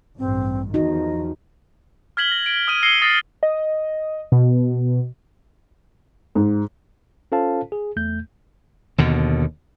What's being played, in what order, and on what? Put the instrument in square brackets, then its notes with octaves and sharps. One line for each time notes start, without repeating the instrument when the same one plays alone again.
[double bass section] A1 G2 [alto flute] C4
[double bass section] E2 D#3 F3 [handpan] D#4 F#4 [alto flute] D#5
[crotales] F6 G#6 B6 F#7 G7
A#6
D7
D#6 F6 D#7
E6 A#6 C7 C#7 D#7 G7
D#6 A6 A#6 C7
[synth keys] D#5
B2
[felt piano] G#2
[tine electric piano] C#4 F4 A4 C5 F5 A5
G#4
E2 A3 G6
[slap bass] D#2 B2 D3